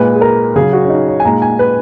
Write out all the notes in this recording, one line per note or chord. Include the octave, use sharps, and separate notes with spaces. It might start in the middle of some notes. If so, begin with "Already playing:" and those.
Already playing: A#2 G#3 B4
G#4
A#4
C#3 F#3 G#4
F#4
C#4
D#4
C#5
G#5
A#2 G#3 A#5
G#5
B4